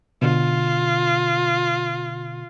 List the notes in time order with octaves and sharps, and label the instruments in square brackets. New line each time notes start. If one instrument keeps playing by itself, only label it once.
[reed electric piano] B2 D3 [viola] F4